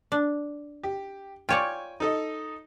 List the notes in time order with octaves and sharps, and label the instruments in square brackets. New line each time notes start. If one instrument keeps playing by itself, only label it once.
[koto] D4
[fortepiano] G4
[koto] F4 C#5 D5 [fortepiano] G5 G#5 C#6
[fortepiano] D#4 A4 D#5